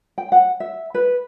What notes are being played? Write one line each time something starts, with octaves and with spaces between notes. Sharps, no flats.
G5
F#5
E5
B4